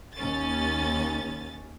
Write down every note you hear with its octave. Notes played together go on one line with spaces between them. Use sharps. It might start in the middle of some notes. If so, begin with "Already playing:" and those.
D#2 C#4 A6